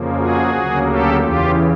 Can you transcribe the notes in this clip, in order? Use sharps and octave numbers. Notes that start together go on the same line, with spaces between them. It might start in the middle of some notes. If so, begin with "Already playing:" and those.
Already playing: F2 C#3 F3 A#3
F#4 G#4
D2 C#3 F#3 A#3
G4 A4
E2 C#3 E3 F4 G4